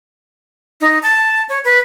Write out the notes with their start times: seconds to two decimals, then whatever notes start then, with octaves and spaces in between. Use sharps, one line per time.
0.81 D#4
1.03 A5
1.49 C#5
1.65 B4